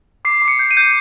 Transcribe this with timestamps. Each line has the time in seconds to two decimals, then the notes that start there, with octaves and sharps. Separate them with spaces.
0.25 D6 C7
0.42 D6
0.48 C#7
0.59 G6
0.71 D#7
0.77 G6